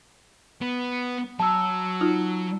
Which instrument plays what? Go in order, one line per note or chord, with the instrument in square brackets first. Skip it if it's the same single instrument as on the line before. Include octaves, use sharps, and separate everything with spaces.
[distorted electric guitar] B3
[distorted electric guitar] F#3 [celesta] A5 E6
[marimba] D#4 F4